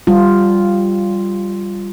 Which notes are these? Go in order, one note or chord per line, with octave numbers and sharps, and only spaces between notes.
G3 F4